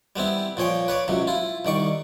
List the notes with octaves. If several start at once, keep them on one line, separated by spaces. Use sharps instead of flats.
G3 B3 C4 E4
A#2 F3 C#5 G5
B4 C#5 D5
C#2 C3 F#3
E4 F4
C2 D#3 D5 C#6